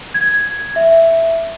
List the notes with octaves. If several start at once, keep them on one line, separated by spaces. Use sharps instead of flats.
G#6
E5